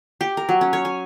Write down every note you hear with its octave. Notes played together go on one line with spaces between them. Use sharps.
G4
A#4
F#3
C#4
C#5
G#5